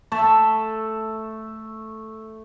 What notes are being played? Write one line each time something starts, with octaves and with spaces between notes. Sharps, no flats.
A3 A4 E5